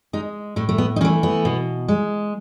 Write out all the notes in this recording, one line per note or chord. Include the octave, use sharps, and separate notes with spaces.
G#3 D#4
A2 A3
A3
B3
D#4
E3 A3 C#4
B3
B2
G#3